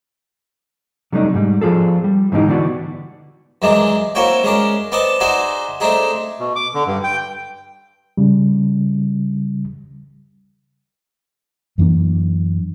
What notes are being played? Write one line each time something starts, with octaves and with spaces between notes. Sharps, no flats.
C3 F#3 G3 A3 D4 D#4
G#2 G3
F3 F4 G#4 A4
G3
G#2 B2 D3 E3 D#4 G4
D3 E3 B3 D4 F#4
F#2 D#3 E3 G#3 D4
A#3 C4 E4 F#4 C#5 G5
G#3 C#4 D4 A#4
B3 C4 D5 D#5 A5
D#4 F#4 G#4 C5 D5 E5
A3 C4 D4 D#4 G#4
B2
D6
D3
G2
G5
C#3 G3
F#2 E3 A#3 D4